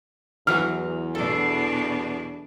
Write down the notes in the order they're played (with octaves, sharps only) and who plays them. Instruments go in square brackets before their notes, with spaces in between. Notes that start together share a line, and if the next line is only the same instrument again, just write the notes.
[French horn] E2 [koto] E3 F#3 F#4 [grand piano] F6
[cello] B2 D4 [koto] A4